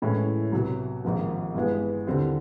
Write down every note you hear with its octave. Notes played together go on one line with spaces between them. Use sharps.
A2 E3 G#3 C#4 E4
C2 B2 F#3
G#1 G#2 F3 A#3
G2 E3 G#3 B3
D#2 D3 G3 C4 E4